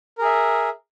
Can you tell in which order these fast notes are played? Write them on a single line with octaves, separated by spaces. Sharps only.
A#4 G#4 E5